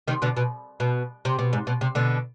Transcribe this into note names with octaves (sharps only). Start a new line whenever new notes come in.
C3 D#3
B2 D3
B2
B2
C3
B2
G#2
B2
C3
B2 D3